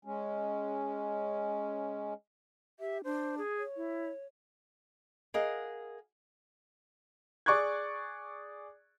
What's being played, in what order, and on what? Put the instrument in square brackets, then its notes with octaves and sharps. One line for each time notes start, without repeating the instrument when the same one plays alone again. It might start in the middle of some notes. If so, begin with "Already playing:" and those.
[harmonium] G#3 C#4
[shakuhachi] G4 [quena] E5
[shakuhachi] D4 [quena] C5
[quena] G#4
[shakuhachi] C#5
[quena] E4
[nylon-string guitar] G#4 A#4 D#5 F5 F#5
[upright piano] G#4 D5 C#6 D6 F#6 G#6